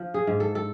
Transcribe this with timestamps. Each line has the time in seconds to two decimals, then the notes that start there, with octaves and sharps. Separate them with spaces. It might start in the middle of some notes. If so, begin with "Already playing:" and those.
Already playing: F3
0.14 G#4
0.27 G#2
0.40 A4
0.55 A4